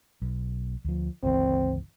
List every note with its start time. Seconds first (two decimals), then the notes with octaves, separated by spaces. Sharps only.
0.22 B1
0.85 D2 F3
1.23 G1 C#2 E3 C4